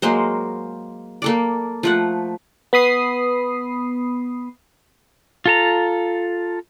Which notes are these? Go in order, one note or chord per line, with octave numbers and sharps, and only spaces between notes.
F#3 G#3 A#3 C5
A#3 A4 D5
F3 A3 F#5
B3 B5 D#6 C7
F4 A4 A#5